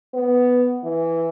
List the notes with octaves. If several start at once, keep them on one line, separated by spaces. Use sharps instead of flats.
B3
E3